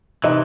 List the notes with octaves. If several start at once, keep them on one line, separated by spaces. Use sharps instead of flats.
C3 E3 D#4